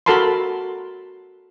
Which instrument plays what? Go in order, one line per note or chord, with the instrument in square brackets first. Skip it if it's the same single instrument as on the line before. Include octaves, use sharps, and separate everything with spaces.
[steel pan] F#4 A4 A#4 A5 B5 C6